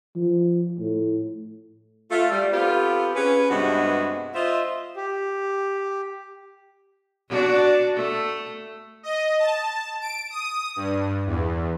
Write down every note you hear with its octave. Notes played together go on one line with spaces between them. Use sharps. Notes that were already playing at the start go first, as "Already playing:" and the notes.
F3
A2
A3 F4
G3
B3 C4 F4 G4 A4
C#4 G#4 B4
G2 C3 G#3 B3 F#4
F4 C5 D#5 E5
G4
D4 F#4 D5
A3
D#5
A5
D7
D#6
G2
E2